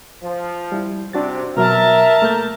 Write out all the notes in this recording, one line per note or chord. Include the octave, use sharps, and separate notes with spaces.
F3
G3 E4
C3 C4 D4 F#4 A6
B2 F#3 A#4 E5 A5
A3 A#3 G6